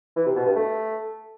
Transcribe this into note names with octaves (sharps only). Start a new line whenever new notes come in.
E3
C3
B2
G2
A3